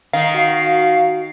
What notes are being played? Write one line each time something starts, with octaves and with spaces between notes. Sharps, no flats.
D#3 F5
F#4